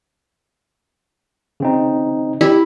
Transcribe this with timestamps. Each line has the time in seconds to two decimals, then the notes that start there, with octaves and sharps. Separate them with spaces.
1.60 C#3 C4 D#4
2.41 E4 G4